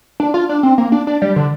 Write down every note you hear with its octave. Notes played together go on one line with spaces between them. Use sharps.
D4
F4
D4
C4
A#3
D4
D4
G3
D3